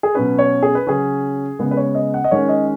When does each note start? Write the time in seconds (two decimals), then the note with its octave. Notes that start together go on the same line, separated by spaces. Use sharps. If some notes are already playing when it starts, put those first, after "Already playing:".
0.03 G#4
0.15 B2 F#3 C#4 B4
0.39 C#5
0.63 G#4
0.75 B4
0.87 C#3 F#3 C#4 G#4
1.59 C#3 G#3 B3
1.71 B4
1.77 C#5
1.95 D#5
2.14 F#5
2.24 D#5
2.31 D#3 G#3 C#4 C#5
2.49 D#5